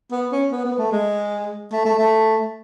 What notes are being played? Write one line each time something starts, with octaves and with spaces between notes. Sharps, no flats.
B3
C#4
B3
B3
A3
G#3
A3
A3
A3